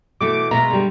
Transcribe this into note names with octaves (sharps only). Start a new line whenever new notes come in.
B2 E3 A3 D6
B2 G#3 F4 E5 A#5
D3 G3